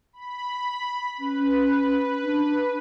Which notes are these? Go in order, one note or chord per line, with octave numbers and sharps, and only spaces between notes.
B5
C#4 B4
D4